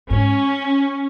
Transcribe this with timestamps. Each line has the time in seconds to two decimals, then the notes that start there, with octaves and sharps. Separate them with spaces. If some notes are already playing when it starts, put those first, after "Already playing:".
0.09 G#2 C#4